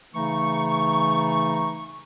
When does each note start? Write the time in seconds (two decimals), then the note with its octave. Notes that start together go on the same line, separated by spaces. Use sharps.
0.15 C#3 E3 A3 D#4 A#5 C#6